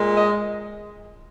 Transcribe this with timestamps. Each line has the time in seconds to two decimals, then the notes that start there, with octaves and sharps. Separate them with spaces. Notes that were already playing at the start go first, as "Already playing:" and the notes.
Already playing: A#2 G#3
0.14 D#5